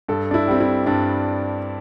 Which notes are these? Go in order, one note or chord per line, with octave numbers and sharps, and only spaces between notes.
G2 A4
D4
E4
G3 C4
E4
G2 D4